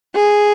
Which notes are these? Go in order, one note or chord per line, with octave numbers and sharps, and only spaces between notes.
G#4